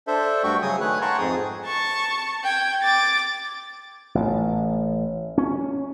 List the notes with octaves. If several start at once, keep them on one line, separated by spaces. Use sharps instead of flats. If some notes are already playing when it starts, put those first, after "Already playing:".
D4 A4 C5 E5
G2 A3 F#4 G5 C#6
C#3 F#3 G#5 D#6
D#3 A3 B4 C#5 G#5 F#6
F#5 G5 A5 A#5 C6 C#6
F2 G#2 G#4 D#6
A5 C#6
G5 G#6
D6 A6
A1
C#4